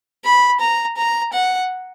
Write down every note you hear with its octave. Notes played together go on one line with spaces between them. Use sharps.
B5
A#5
A#5
F#5